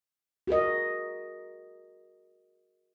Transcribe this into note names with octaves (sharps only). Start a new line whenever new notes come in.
F#4 G#4 A#4 D#5